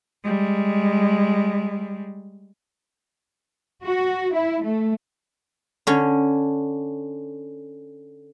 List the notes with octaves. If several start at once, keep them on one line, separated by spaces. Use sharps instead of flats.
G3 G#3
F#4
E4
A3
D3 C#4